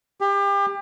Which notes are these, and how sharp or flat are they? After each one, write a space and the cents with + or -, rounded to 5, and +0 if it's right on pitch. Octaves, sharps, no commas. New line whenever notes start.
G4 +30